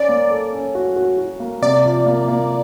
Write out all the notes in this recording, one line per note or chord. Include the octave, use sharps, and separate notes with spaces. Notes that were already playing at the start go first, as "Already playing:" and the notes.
Already playing: C#4 D5
A#3
A4
C#4
F#4
F#4
F#4
A#3
C3 D5
F3
A#3
A#3